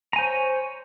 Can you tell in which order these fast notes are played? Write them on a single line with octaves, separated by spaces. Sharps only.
A#5 G#5 C5 C#5